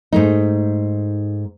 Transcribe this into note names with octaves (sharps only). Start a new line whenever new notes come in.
G#2 A3 D#4